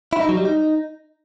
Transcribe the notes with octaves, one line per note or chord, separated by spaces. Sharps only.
E4
D#4
F#3
G3
D#4